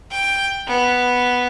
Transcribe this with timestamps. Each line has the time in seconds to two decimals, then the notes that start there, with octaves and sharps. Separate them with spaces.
0.12 G5
0.68 B3